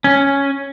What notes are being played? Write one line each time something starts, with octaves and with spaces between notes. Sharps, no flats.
C#4